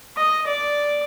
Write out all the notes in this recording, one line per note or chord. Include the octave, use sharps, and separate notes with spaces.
D#5
D5